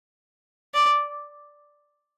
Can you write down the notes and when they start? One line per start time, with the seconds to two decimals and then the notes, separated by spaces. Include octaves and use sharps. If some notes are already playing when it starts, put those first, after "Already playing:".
0.74 D5